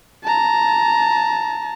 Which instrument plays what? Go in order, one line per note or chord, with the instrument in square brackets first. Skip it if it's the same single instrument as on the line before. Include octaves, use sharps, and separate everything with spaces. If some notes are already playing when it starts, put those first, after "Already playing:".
[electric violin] A5 A#5